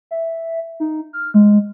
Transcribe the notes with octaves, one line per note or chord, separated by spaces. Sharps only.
E5
D#4
F6
G#3